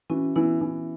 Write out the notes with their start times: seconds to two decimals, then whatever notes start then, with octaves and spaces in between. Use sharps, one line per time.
0.10 E3 C#4 F#4
0.36 E3 B3 E4
0.61 E3